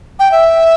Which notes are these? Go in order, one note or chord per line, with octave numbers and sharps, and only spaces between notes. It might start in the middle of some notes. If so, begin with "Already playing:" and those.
G5
E5